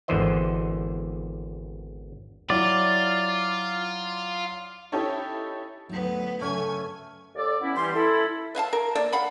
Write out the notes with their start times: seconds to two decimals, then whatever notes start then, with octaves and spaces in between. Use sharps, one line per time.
0.08 G#1 E2 D3 E3 C5 D#5
2.50 F#3 E4 F4 D5
4.92 C#4 D#4 E4 G4 A4 C#5
5.89 D2 F#3 B3 D#4
6.41 F#2 C#3 A3 C#4 G#5
7.35 D#2 A4 D5
7.61 B3 C#4 E4
7.76 E3 G3 C6
7.95 E4 A4
8.55 B4 E5 F5 A5
8.73 A#4
8.95 A#3 D5 E5 A5
9.12 F5 F#5 B5